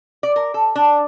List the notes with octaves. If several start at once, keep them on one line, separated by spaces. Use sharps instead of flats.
D5
A#4
A4
D4